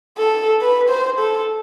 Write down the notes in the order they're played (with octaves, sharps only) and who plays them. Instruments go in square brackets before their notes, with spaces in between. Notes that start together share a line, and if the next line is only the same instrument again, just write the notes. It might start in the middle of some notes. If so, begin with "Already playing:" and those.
[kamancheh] A4
B4
C5
A4